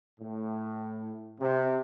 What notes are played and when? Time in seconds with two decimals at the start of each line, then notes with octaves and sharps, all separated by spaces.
0.20 A2
1.39 C3